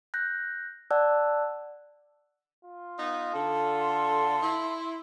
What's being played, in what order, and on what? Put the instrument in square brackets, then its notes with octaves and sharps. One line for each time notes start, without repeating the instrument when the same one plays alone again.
[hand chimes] F#6 G6 A#6
D5 F#5 A5 E6 F#6
[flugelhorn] F4
[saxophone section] B3 D#4
[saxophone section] D3 [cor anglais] A4
[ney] C6
[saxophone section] E4